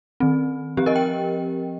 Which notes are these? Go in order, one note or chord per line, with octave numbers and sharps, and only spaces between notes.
D#3 C4
F3 C4 G4
A#4 D#5
G5